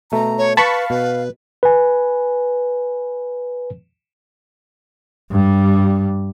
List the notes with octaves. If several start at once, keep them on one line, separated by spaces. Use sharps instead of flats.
B2 A3 A#5
C#5
B4 F5 A5 B5 C#6
B2 B4
B4 G#5
G2 G3